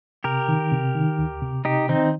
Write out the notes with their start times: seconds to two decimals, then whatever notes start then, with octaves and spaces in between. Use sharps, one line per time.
0.24 C3 G4 A#4
0.48 D#3
0.72 C3
0.95 D#3
1.19 D2
1.42 C3
1.65 C3 D#4 G4
1.89 D#3 C4 D#4